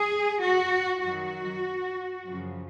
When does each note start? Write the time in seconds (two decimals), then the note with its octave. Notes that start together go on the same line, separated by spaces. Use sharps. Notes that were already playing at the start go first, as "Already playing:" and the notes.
Already playing: G#4
0.42 F#4
1.04 F#2 D#3 F#3 F#4
2.27 F#2 C#3 F3